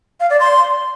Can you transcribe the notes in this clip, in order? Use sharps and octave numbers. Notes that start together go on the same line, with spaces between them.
F5
D5
C6